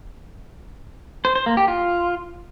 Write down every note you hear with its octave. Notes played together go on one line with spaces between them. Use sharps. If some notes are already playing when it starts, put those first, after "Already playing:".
C5
C5
A#3
G4
F4